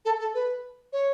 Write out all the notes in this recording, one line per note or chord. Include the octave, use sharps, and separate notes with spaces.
A4
A4
B4
C#5